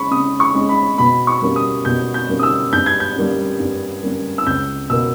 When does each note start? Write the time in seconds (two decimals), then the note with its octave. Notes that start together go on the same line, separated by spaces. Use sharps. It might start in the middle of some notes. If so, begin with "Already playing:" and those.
Already playing: G#3 C#4 B5 C#6
0.11 C#3 D#6
0.40 C#6
0.55 G#3 C#4
0.69 B5
0.98 B2 B5
1.27 C#6
1.42 G3 A#3 C#4
1.56 D#6
1.85 B2 G6
2.14 G6
2.29 G3 A#3 C#4
2.39 D#6
2.43 E6
2.73 G2 G6
2.86 G#6
3.00 G6
3.16 G3 A#3 C#4
3.60 G2
4.03 G3 A#3 C#4
4.38 E6
4.46 C#2 G6
4.89 B2 A#3 E6